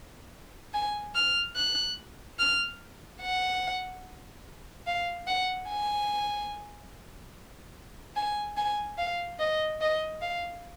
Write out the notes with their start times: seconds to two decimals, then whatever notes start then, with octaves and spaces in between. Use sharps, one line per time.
0.74 G#5
1.15 F6
1.56 F#6
2.39 F6
3.21 F#5
4.87 F5
5.27 F#5
5.69 G#5
8.16 G#5
8.57 G#5
8.98 F5
9.39 D#5
9.81 D#5
10.22 F5